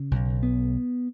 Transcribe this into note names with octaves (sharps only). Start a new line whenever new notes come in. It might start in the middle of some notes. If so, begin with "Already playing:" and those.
Already playing: C#3
B1
B3